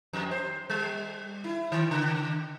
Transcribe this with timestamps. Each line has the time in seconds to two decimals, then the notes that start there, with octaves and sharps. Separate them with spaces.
0.13 F2
0.31 C5
0.70 G3
1.44 E4
1.72 D#3
1.91 C#3